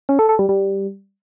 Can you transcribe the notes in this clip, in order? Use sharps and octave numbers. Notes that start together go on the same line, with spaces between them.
C#4
A4
A4
G3
G3